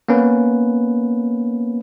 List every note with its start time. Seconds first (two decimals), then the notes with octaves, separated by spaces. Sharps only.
0.08 A#3 B3 C#4 B4